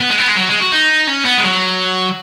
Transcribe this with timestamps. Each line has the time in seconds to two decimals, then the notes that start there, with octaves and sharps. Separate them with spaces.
0.01 B3
0.10 G#3
0.19 B3
0.28 G#3
0.37 F#3
0.49 G#3
0.60 F#4
0.72 D#4
1.07 C#4
1.25 B3
1.38 G#3
1.44 F#3